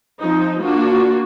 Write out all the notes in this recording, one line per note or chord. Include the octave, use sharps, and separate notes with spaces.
F3 C4 D#4
A#3 D4 F4 F#4